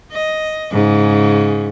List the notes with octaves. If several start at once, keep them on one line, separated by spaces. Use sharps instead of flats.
D#5
G#2 C#3